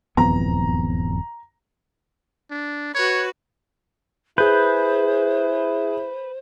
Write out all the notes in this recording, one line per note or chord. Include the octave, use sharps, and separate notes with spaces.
D#1 E2 G2 F3 B3 C4 A#5
D4
F#4 B4 C#5
E4 G#4 B4 C5 G6